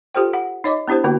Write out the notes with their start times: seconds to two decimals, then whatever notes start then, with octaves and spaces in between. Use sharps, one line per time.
0.15 F4 G4 A4 C5 G5
0.34 F#5
0.64 D#4 C#5 D#5 D6
0.88 B3 D4 E4 G4 C5
1.04 D3 A#3 B3 F#4